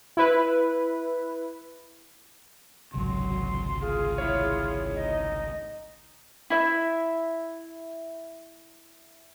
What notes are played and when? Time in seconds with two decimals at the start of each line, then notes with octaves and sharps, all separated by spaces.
0.17 E4 B4
2.94 G#1 C#2 C3 F#3 C6
3.81 F4 G#4
4.18 E4 C#5
4.95 D#4 D#5
6.50 E4 E5